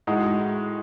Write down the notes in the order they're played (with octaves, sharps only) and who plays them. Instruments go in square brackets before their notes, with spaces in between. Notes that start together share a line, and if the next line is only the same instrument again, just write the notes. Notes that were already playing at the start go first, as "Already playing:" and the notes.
[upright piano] A2 G#3 D#4 F#4